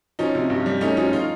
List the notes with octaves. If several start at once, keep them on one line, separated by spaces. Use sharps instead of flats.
F3 C#4 D#4
C3
G2
G3
A3 C#4 D#4
F3 C#4 D#4
D#4 F4